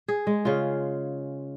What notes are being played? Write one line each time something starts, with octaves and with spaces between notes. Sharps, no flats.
G#4
G#3
C#3 F4